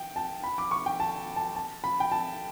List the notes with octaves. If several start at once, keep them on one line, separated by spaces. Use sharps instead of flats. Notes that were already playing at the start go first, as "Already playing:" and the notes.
Already playing: G5
A5
B5
D6
C#6
G5
A5
A5
A5
B5
G5
A5